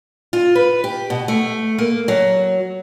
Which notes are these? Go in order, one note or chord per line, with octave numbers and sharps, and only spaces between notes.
F4
B4
G4
B2
A3
A#3
F#3